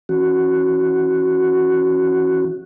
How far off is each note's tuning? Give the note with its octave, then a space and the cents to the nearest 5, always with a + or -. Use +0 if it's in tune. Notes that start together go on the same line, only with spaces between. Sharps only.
E3 +0 C#4 -10 F#4 +0